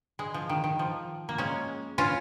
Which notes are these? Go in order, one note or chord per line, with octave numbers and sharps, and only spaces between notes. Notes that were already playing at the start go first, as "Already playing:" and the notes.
G#3
F3
D#3
D#3
F3
A#3
G#3 C#4
C#4 F4